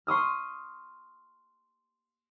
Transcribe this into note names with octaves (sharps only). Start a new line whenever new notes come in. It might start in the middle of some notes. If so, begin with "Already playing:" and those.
C6 C#6 D#6 F6